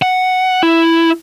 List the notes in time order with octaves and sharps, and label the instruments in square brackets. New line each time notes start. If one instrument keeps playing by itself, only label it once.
[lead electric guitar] F#5
E4